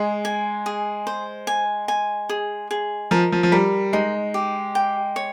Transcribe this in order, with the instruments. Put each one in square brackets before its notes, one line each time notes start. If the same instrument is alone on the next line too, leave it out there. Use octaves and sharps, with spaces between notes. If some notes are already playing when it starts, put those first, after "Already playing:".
Already playing: [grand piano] G#3 [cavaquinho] G#4
[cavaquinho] G#5
G#4
C5
G#5
G#5
G#4
G#4
[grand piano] F3 [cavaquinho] A#4
[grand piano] F3
F3
[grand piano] G3 [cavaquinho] A#4
[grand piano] G#3 [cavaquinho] D#4
[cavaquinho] G4
G5
C#5